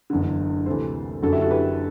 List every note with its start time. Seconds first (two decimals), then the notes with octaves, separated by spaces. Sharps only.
0.10 F#1 E2 D3
0.66 D2 C3 E3 A4 C5
1.22 F#1 F#2 D3 F#4 A4
1.32 E4 G4
1.41 F#4 A4
1.51 G4 B4